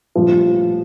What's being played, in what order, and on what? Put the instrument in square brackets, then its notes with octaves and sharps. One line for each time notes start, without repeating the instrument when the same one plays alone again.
[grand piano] A#1 A2 G3 [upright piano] F3